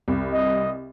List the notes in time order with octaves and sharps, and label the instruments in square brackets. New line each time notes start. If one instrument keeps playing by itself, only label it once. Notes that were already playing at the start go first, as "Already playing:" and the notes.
[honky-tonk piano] C2
[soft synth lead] D#5